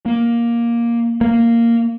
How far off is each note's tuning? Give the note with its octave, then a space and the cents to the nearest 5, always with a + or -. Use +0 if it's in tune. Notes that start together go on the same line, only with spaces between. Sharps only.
A#3 +10
A#3 -10